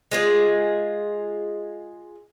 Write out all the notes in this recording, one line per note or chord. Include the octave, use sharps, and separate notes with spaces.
G#3 F4 G#4